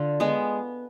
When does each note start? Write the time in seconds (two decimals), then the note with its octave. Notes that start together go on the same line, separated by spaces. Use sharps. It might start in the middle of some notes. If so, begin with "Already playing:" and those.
Already playing: D3 F4
0.20 G#3 B3